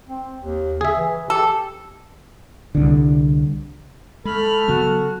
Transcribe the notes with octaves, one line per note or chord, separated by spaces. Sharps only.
C4
D#2
C#3 G#4 E5
E3
G4 A4
C2 D3
G#3 A3 A4 B5 F6
C#3 F#3 B3 F#4